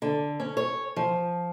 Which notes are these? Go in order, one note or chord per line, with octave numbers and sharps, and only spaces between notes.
D3
C#4
C#5
F3